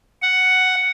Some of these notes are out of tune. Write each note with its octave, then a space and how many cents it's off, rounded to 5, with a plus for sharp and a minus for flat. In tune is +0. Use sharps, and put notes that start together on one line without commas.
F#5 +5